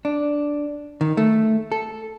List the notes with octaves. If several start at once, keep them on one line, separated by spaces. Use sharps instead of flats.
D4
D#3
A3
A4